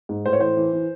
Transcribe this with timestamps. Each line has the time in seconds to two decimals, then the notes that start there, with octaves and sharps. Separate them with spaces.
0.09 G#2
0.26 A2 C5
0.33 C#5
0.40 E3 C5
0.57 E3
0.73 E3